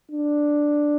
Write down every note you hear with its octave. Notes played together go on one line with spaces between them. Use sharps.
D4